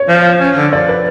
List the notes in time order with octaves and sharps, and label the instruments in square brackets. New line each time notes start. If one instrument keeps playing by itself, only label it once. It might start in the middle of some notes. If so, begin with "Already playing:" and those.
Already playing: [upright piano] C#5
[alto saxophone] F3
C#4
D3
[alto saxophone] F3 [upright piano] D5
[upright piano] B4